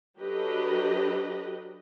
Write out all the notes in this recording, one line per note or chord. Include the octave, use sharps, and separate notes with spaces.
F#3 D4 G4 A4 B4 D#5